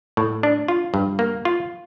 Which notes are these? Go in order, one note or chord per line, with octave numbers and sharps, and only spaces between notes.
A2
D4
F4
G2
A#3
F4